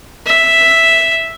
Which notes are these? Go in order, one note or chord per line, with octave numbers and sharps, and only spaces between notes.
E5